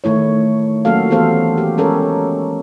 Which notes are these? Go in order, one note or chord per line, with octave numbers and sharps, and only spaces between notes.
D#3 A3 E4 C#5
F#3 A#3 C#4 F#4 A4 F5
E3 B3 G4 A4 C5 F5
G4
G#3 C#4 A4 A#4 C#5